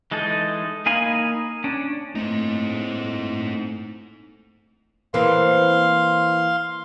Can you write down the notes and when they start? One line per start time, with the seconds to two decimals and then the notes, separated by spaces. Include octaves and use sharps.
0.11 E3 G#3 D#4 A4
0.86 A#3 D#4 F5 G#5 B5
1.64 C#4 D4
2.15 A2 A3 A#3 C4 D#4 C5
5.14 E3 A#3 C4 F5 C6